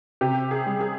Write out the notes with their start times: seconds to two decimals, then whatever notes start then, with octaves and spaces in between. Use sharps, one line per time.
0.21 C3 G4
0.51 G#4
0.67 G3
0.81 G#4